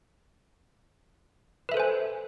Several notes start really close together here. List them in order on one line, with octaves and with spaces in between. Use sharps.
B4 E5 A4 C5 G#5